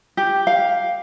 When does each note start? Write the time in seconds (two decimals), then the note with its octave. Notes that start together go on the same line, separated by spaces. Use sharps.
0.17 G4
0.47 F5